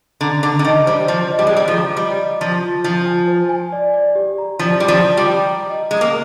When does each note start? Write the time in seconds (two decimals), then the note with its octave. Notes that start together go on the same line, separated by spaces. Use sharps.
0.21 D3 A#5
0.43 D3 D6
0.59 D3
0.65 D#3 D#5
0.86 G3 C5
1.08 F3 C5
1.31 D#5
1.39 G3
1.47 G#3
1.53 G3 D6
1.68 F3
1.74 A#5
1.96 G3 D#5
2.19 D#5
2.41 F3 F4
2.63 F4
2.84 F3 F4
3.06 G#5
3.28 C5
3.49 G#5
3.72 D5
3.94 D5
4.15 G4
4.38 A#5
4.59 F3 D5
4.80 G3 D5
4.88 F3
5.03 D5
5.17 G3
5.26 G5
5.47 A#5
5.69 D#5
5.91 G#3 A#5
6.01 A#3